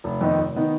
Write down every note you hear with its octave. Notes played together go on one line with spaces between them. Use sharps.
F1
F2 D#3 B3 D#4
F1
D#3 B3 D#4